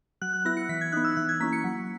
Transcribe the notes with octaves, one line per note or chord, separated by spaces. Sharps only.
F#3 F#6
F#6
B3 E4 A#6
C#7
E3 B6
G#6
B3 D#4 F#6
E6
E3 F#6
G#6
A#3 C#4 E4 B6
C#7
F#3